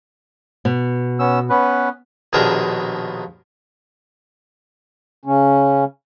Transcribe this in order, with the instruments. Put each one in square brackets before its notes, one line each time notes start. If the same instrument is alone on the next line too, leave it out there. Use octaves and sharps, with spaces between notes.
[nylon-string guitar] B2
[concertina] B3 C#4 E6
B3 C#4 B4
[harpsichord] A#1 D#2 B2 D4 G#4 A#4
[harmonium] C#3 C#4